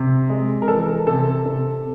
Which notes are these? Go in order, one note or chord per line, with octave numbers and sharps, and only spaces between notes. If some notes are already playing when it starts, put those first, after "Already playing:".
Already playing: C3
G#3
A#4
E3 A4
C3 A4
C3